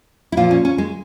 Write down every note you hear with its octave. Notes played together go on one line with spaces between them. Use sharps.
E4
A#2 F3 F4
C#4
C#4
G#3